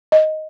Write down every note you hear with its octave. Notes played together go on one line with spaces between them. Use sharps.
D#5